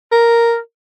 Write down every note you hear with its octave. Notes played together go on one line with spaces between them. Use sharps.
A#4